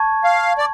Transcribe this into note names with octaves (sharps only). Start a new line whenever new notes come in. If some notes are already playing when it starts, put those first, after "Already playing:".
Already playing: A5 C#6 G#6
F5
D5